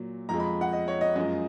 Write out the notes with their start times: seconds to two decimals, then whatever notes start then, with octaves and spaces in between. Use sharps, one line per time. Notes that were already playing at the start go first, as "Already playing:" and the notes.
Already playing: A#2 F#3
0.29 F2 F3 G#3 A#5
0.40 B5
0.61 F#5
0.73 D#5
0.88 C#5
1.01 D#5
1.16 F#2 F3 G#3 D#5